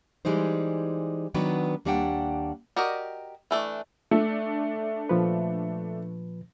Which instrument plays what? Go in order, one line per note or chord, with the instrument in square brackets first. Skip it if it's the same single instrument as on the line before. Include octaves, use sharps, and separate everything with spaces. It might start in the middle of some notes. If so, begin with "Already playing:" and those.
[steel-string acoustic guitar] E3 G3 G#3 D#4 C5
D#3 F#3 B3 D4 B4
D#2 G3 A#3 D4 F#5 G5
[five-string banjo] F#4 G4 A#4 D5 D#5
E3 A3 D4
[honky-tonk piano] A3 D4 [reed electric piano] E5
[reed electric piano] A#2 F3 B4